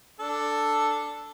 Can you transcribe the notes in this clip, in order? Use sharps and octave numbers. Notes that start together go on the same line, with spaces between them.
D4 A4